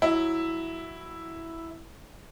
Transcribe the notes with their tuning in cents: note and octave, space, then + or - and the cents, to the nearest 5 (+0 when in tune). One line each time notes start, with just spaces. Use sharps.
F#3 +0 E4 +0